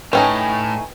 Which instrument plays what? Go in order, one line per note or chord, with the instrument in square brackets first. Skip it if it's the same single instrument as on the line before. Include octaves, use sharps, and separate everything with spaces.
[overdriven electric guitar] A2 [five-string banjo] A3 C#4 D#4 [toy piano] B4 G5 [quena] G#5